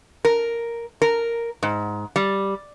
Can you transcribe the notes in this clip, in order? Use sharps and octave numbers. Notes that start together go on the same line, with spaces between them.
A#4
A#4
G#2
G3